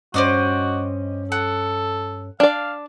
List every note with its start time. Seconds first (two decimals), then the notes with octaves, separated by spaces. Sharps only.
0.14 G2 C#4 F#4 C5 D5 D#5
1.32 A4 F#5
2.40 D4 D5 F5